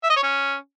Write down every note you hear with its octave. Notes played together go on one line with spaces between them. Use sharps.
E5
D#5
C#5
C#4